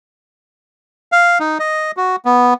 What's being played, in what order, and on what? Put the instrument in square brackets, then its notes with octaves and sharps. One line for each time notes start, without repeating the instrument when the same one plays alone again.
[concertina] F5
D#4
D#5
F#4
B3